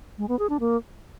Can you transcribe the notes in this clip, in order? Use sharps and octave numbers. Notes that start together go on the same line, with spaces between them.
G#3
B3
G#4
D4
A#3